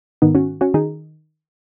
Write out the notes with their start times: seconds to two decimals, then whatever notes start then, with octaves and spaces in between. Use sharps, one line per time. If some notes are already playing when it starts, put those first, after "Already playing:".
0.22 G#2 D#3 B3 D#4
0.35 C#4 F#4
0.61 C#4 F#4
0.74 D#3 D#4 G#4